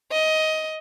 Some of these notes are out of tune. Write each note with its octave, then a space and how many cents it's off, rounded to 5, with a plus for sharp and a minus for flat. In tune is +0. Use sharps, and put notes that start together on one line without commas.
D#5 +15